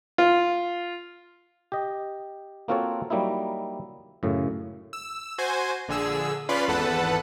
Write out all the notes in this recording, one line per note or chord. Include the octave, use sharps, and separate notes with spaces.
F4
G4 D#5
A#3 C4 F4 F#4 A4 C#5
F#3 G3 A#3 D#4 E4
F#2 A2 C#3
E6
F#4 C5 G#5
A#1 D3 G#4 E6
C#4 F4 B4 D5 B5 C6
G#1 E2 A4 B4 F#5 A5